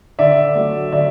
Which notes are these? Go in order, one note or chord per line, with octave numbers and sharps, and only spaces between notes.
D3 D5 E5
F#3 A3
D3 D5 E5